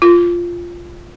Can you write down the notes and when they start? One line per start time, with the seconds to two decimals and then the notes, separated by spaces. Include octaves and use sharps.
0.02 F4